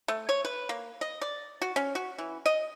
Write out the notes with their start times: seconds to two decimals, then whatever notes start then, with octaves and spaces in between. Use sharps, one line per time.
0.08 A3
0.29 C#5
0.45 B4
0.69 A#3
1.01 D#5
1.21 D5
1.61 F#4
1.76 C#4
1.95 F#4
2.18 E3
2.46 D#5